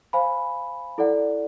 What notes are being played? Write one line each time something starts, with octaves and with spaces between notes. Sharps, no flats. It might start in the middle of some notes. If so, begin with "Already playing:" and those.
C5 F5 G#5 B5
E4 A4 D5 F#5